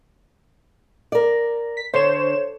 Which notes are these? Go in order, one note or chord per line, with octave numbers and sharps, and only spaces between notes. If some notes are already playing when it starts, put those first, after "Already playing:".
A#4 D5
B6
D3 C5 C#5 E7